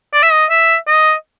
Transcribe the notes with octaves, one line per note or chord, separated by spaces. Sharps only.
D5
E5
D#5
E5
D#5